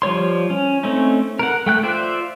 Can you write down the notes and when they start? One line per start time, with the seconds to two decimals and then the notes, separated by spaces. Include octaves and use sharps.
0.02 F3 G3 C#5 C6
0.50 C#4
0.83 A3 C4 C#4 D#4
1.39 A#4 F#5
1.66 A3 G5 F#6
1.83 F4 C5 D5 E5